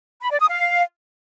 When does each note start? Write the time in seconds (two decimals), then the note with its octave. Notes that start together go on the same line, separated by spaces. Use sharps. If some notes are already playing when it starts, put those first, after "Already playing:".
0.22 B5
0.31 D5
0.40 D#6
0.49 F5